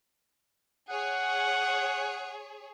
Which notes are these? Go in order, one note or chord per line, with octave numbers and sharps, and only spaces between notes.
G#4 C#5 F#5